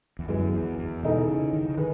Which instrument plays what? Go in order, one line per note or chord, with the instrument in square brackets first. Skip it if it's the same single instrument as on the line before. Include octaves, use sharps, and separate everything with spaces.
[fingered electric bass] E2
[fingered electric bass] F#2 [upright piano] E3 G#3 B3 F#4
[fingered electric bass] E2
E2
[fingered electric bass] B2 [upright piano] E3 G#3 D#4 A4
[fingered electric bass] C#3
D#3
C#3
[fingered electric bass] D#3 [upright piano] G#4 B4